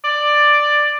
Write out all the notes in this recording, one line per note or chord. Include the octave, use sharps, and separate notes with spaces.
D5